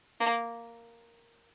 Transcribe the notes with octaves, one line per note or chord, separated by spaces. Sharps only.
A#3